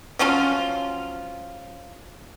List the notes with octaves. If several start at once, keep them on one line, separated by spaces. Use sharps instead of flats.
F3 F#3 C#4 F4